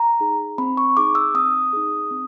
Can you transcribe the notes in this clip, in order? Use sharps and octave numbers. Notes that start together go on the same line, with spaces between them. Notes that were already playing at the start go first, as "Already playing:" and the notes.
Already playing: A#5
D#4 G#4
C4 B5
C#6
D#4 G#4 D6
E6
C4 D#6
D#4 G#4
C4